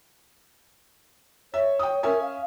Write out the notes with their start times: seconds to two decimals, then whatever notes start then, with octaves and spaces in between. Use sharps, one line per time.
1.54 C#5 E5
1.79 G5 D#6
2.03 C#4 A#4 E5 G#5
2.21 F5